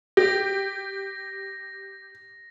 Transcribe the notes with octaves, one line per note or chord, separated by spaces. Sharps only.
G4 A#6